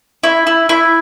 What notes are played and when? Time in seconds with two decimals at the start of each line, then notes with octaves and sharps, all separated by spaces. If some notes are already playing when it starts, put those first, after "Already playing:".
0.23 E4
0.47 E4
0.69 E4